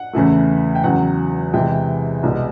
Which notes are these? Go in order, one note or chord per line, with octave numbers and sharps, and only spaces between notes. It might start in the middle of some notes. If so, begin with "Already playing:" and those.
Already playing: F#5
E2 C#3 E3 A3
G5
E2 C#3 F#3 F#5
E2 C3 E3 G#3 G5
C2 B2 G#3